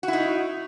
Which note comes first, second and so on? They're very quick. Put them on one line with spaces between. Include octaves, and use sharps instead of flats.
F#4 E4 D#4